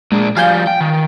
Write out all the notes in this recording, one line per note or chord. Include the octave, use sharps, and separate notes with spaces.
A#2 G#3 D4
F3 G3 F5 G#5 G6
G5
D#3